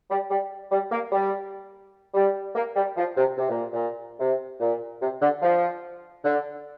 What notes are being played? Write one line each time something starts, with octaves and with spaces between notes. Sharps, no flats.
G3
G3
G3
A#3
G3
G3
A#3
G3
F3
C3
C3
A#2
A#2
C3
A#2
C3
D3
F3
D3